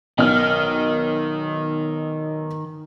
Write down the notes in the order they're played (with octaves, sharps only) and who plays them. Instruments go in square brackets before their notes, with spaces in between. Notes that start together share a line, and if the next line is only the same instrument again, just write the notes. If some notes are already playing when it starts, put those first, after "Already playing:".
[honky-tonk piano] B1 F6 [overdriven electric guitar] D#3